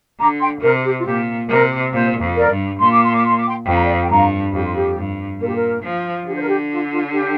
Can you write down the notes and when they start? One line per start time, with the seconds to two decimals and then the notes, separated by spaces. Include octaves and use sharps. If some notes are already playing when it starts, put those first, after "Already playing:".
0.19 D3 A#5 D6
0.40 G5 C6
0.62 C3 A#4
0.84 G4
1.00 F4
1.05 A#2 G4
1.49 C3 A#4
1.92 A#2 C5
2.21 F2
2.35 A#4 D5
2.51 G2
2.79 A#2 C6
2.90 D6
3.02 C6
3.13 D6
3.25 C6
3.36 D6
3.47 G5 C6
3.66 F2 G5
3.74 A#5
3.82 D5 G5
4.02 G5
4.09 G2 F5 A#5
4.53 F2 G4
4.64 F4
4.75 G4
4.97 G2
5.40 A#2 A#4
5.47 G4
5.55 A#4
5.83 F3
6.26 D3 G4
6.35 C5
6.41 A#4
6.48 G4
6.71 F4
6.92 F4
7.13 G4